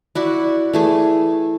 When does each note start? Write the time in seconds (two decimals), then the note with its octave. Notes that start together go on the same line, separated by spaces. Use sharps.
0.15 E4 F#4 D5
0.73 E3 A3 G#4